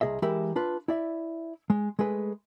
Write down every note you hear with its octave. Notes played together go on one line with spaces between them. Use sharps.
C2 G#4 D#5 E5
E3 G#3 G4 A#4 E5 B5
D4 F4 B4
E4 D5 E5
G#3
G#3 A3 G#4 B4